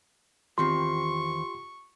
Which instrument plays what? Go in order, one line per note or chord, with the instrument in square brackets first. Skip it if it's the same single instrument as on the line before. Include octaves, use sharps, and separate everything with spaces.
[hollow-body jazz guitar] E2 D#3 C4 [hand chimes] F4 G4 C7 [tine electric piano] C6 [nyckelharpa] C#6